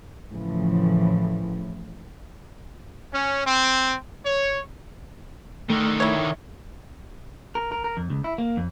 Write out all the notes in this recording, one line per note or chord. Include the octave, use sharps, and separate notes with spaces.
A2 C#3 E3 F3
C#4
C4
C#5
D3 D#3 A3
E4 C#5
A#4
A#4
A#4
F2
C#2
E4
A#3
F2